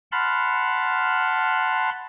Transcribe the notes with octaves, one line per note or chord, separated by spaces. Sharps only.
F#5 A5 B5 C6 F6